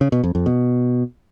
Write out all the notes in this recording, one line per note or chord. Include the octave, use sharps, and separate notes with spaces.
C#3
B2
F2
F2
B2